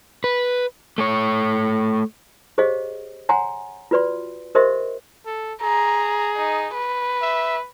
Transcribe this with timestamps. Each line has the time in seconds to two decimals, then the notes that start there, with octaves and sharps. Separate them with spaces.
0.24 B4
0.98 A3 C#5
2.58 G4 G#4 C5 C#5 D#5 F5
3.29 C#5 F#5 G#5 A#5 C6
3.91 F4 F#4 B4 D5 C6
4.55 G4 A#4 C5 D#5 E5 C6
5.26 A4
5.62 G#4 A#5
6.37 D#4
6.74 B4
7.22 E5